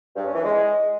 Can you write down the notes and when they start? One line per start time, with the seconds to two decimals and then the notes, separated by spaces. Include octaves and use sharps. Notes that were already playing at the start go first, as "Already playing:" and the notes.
0.16 G2
0.25 C#4
0.35 E3
0.45 G#3